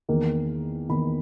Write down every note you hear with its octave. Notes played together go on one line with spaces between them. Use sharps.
E2 D#3 A#3
E2 D#3 A#3 B5